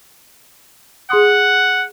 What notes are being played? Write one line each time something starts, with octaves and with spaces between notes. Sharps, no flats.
G#4 F#5 C6 D#6